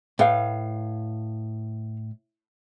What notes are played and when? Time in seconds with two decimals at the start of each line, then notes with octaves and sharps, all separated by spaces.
0.19 A2 B4 F5